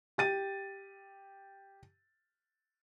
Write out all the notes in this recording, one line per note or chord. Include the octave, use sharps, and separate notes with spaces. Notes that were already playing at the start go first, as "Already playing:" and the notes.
G4 A6 D#7